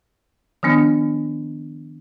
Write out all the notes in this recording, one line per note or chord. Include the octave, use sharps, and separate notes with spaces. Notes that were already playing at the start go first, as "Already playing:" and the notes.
D#3 F3 B3 D4